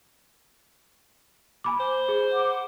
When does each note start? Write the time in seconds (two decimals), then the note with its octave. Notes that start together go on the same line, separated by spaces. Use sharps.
1.64 G#5 B5 D6
1.80 C5
2.08 G#4
2.32 F#5 D6